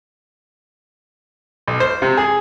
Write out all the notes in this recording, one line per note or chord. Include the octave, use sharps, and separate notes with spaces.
B1
C5
C3
G#4